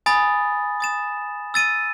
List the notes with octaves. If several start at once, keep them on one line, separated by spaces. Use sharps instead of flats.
G#5 B5 D#6 A6
D#6 A6 E7
E6 A6 D#7